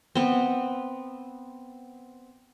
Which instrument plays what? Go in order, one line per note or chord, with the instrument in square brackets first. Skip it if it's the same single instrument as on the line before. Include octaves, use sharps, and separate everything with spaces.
[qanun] B3 C4